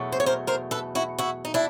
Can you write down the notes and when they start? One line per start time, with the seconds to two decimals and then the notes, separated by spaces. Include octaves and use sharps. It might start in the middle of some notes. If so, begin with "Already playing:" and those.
Already playing: E2 B2 F#3 A3
0.12 C5
0.20 C#5
0.26 A#4 C5
0.47 A#4 C5
0.71 A4 B4
0.95 E4 F#4
1.18 E4 F#4
1.45 D#4
1.54 D4 E4